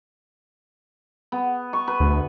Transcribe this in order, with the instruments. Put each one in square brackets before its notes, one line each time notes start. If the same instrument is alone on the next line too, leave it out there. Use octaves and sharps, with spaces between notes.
[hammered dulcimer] B3
C#6
B4
[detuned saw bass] D2